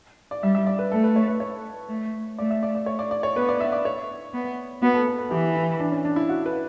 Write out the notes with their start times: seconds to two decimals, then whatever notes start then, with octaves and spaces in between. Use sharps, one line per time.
0.31 D5
0.43 G3 E5
0.55 E5
0.67 D5
0.79 B4
0.92 A3 A4
1.04 B4
1.16 C#5
1.28 B4
1.40 C#5
1.89 A3
2.38 A3 D5
2.51 E5
2.63 D5
2.75 D5
2.86 C#5
2.99 D5
3.11 D5
3.23 C#5
3.36 B3 B4
3.49 D5
3.61 E5
3.72 D5
3.85 C#5
4.34 B3
4.82 B3 F#4
4.94 A4
5.07 A4
5.19 B4
5.31 E3 G4
5.56 E4
5.80 D4
5.92 C#4
6.05 D4
6.16 E4
6.29 F#4
6.46 B4